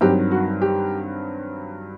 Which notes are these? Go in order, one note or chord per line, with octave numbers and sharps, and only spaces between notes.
G2 D#3 F#3 C4 G4
F#4
G4